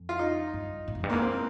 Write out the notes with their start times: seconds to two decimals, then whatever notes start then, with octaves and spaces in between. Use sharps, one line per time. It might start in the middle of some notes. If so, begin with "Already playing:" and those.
Already playing: F2
0.09 F4
0.19 D#4
0.54 G2
0.88 G#2
0.95 F2
1.04 G2
1.10 G#2 A#3
1.22 C4